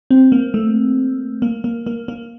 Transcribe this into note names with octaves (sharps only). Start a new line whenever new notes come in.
C4
A#3
A3
A#3
A#3
A#3
A#3